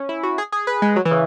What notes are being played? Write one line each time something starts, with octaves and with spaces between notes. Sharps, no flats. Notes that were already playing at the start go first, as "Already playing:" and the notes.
Already playing: C#4
E4
F#4
G#4
G#4
B4
G#3
F#3
E3
C#3